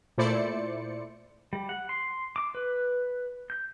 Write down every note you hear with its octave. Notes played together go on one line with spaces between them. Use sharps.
A#2 A3 E4 C5 D5 C#7
G3
F#5
C6
D6
B4
G6